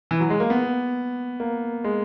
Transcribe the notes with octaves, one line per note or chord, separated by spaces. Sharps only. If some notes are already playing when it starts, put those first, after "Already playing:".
E3
F#3
G#3
A#3
B3
A#3
G#3